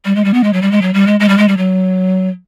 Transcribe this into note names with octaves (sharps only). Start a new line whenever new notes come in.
G3
G#3
G3
B3
G#3
F#3
G3
G#3
F#3
G3
G#3
G#3
G3
G#3
G3
F#3